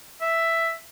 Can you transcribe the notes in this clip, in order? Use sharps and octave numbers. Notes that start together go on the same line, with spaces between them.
E5